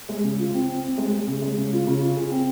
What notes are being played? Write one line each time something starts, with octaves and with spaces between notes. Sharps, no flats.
G#3
C#3
F4
C4
C4
C4
G#3
G#3
C#3
G#3
C#3
F4
C#3
F4
G#4
C4